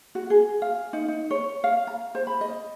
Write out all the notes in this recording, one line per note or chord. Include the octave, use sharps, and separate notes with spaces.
F#4
G#4
F5
D#4
D#4
C#5
F5
A#5
C5
B5
D#5